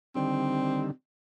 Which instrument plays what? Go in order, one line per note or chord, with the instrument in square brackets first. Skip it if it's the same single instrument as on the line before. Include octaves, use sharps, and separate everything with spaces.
[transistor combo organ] D3 D#3 G3 [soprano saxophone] C4